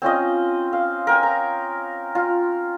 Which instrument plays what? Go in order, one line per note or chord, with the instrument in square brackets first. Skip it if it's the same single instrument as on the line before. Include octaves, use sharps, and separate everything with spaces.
[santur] C4 C#4 F4 D#5
F5
A#4 G5 G#5
A#5
F4